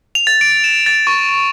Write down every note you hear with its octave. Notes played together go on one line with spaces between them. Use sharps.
F7
A6
D7
E7
A6
C#6